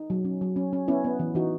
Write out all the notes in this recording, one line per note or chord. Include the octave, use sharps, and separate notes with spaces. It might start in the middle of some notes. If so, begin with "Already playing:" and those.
Already playing: D#4
F#3
C#4
F#3
C#4
C#4
B3 C#4 E4
B3
E3
E3 D#4 F#4